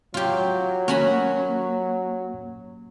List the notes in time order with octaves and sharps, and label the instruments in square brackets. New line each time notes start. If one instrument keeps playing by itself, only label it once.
[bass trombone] F#3 [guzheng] F4 G4
[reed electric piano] A#3 [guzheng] C#4 F#4 B5